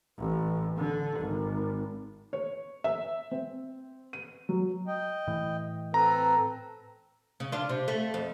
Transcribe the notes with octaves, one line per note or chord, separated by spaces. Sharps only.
A1
D3
G#1
C#5
E5
C4
D#7
F#3
D#5 G5
A2 E3
C4 A4 B4 A#5
C#3
D4 F4
C3
A3
F2